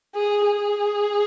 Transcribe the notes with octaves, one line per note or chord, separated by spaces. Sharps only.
G#4
G#4